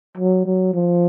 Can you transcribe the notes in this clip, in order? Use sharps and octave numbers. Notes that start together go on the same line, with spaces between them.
F#3
F#3
F3